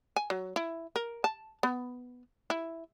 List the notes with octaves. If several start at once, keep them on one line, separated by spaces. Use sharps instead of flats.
G#5
F#3
E4
A#4
A5
B3
E4